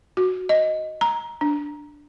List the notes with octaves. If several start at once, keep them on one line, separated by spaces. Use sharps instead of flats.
F#4
D#5
A#5
D4